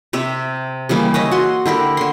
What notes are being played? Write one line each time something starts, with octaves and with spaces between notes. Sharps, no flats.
C3 C4 E5
C#3 E3 G3 A#3
C#4 C#5 D#5 E5
F#4 C6
D3 E4 G4 A#4
D3 C6